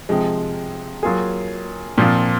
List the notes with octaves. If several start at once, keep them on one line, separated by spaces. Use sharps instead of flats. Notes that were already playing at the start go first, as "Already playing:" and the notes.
C3 F3 G#3
F#3 A#3 F4 G#4
A#2 F3 C4 F4